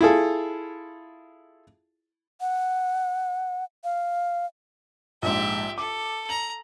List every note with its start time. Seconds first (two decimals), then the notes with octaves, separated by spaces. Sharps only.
0.01 E4 F4 G#4 A4
2.41 F#5
3.84 F5
5.22 A#1 G#2 G4 E5
5.78 A4 D6
6.29 A#5 F#7